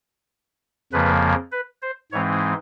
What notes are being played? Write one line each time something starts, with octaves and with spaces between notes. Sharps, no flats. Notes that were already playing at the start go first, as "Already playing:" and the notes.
F2 C#3 F3 A#3 B4
B4
C5
G#2 E3 G#3 C4 D#4 C#5